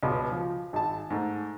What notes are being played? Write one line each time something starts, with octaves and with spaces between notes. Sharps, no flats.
C#2 B2
F3
G#1 A5
G#2 A3